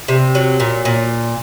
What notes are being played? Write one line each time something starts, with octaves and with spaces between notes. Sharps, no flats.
C3
F#3
A#2
A#2